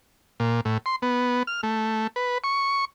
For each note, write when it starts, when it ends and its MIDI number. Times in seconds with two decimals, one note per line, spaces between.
0.40 0.61 46
0.65 0.78 45
0.86 0.96 84
1.02 1.43 59
1.47 1.61 89
1.63 2.07 57
2.16 2.38 71
2.44 2.85 85